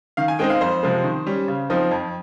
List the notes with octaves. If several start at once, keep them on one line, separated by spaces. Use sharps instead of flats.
D#3 F5
G#5
G#3 C4 D#4 G5
F5
F2 C5
C3 F3 G#3
D#3
G3 C#4
C#3
F3 C4 D#4
F2